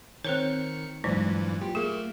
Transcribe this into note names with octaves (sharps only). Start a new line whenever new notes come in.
D#3 C4 C5 C#5 C#7
G2 A#2 E3 F#3 G#3 D#4
F4 G4
A3 A#3 G#4